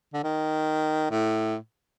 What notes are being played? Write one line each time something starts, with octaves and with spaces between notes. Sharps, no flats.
D3
D#3
A2